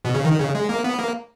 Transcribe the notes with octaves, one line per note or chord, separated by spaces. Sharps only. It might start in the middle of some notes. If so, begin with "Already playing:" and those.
B2
C#3
D#3
C#3
G#3
A#3
B3
A#3